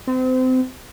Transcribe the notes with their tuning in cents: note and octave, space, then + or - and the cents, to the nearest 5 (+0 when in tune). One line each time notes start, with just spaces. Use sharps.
C4 -30